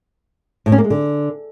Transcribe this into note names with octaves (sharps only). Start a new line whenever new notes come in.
A2
C#4
A#3
G#3
D3